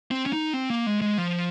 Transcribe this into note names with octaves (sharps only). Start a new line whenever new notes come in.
C4
C#4
D#4
C4
A#3
G#3
G#3
F3